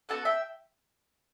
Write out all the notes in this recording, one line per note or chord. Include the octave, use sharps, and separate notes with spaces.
B3 D#4 F#4 A4 F#5 A5
E5 G5